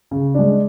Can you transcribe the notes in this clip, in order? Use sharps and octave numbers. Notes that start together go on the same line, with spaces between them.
C#3
G#3 D4